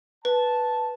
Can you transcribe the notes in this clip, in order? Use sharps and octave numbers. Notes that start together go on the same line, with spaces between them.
B4 A5